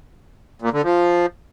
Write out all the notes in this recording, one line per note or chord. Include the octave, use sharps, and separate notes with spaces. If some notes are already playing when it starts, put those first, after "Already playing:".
A#2
D3
F3